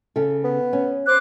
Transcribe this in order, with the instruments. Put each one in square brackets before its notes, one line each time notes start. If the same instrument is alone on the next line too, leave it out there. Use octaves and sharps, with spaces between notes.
[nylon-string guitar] C#3 A4
[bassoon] B3
[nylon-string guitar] C#4
[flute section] C5 D6 F#6